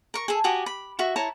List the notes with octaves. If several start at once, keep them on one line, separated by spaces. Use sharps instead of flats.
A#4 C#6
G#4 A4
F#4 G4 G#5 D#6
B5
F#4 E5 C#6
E4 C#5 A5 A#5